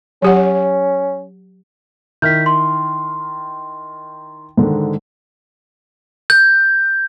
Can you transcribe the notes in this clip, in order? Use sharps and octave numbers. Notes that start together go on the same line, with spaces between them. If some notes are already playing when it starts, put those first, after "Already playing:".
F#3 C#4 G4 F#5
D#3 E4 F6 G6 B6
C6
G#2 D3 D#3
G6